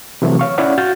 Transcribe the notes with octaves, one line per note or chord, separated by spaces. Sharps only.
C3 E3 F#3 A3
C#5 F5 C#6
C#4 E4 C#5 D5 F5 F#5
F#4 F5 G6 A6